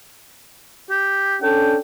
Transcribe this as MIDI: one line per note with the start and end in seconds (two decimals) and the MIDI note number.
0.90 1.36 67
1.42 1.77 61
1.42 1.77 62
1.42 1.77 69
1.42 1.77 79